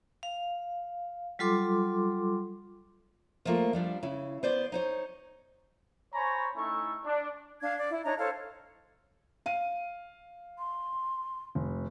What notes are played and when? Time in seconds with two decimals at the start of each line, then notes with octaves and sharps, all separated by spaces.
0.23 F5
1.39 F#3 G3 F4 A4 C6 D6
3.45 F3 G3 A3 A#3 F4
3.73 F3 G3 D4
4.03 C#3 E4
4.43 B3 C5 D5
4.72 D#4 C5 C#5
6.13 C5 C#5 G#5 A#5 B5 C#6
6.56 A3 C#4 D#4 E4 A4 C#6
7.05 D4
7.61 D4 F5 G#6
7.78 D5
7.90 E4
8.05 D4 D#4 C#5 A#5
8.19 A4 C5 C#5 F5
9.46 F5 D#7
10.59 C6
11.55 F1